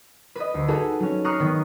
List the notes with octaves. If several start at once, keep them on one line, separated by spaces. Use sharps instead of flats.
B4 D#5
D2
D#4 F#4 G#4 A4 B4
F#3 C#4
A#5 C#6 D#6 F6 F#6 C7
D#3 B3